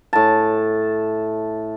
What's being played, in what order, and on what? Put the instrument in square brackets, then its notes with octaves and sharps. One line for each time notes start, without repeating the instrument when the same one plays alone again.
[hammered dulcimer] A2 A5